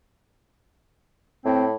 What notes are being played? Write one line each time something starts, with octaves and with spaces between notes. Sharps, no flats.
A2 C4